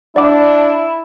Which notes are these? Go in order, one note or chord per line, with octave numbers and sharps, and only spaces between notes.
D4 E4 D5 F#5 D6